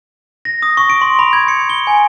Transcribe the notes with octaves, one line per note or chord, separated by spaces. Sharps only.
A#6
D#6
C#6
D7
C6
B5
G#6
C#7
G7
G#5